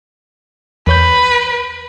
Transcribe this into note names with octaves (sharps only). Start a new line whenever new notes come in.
E2 B4 C#5 G6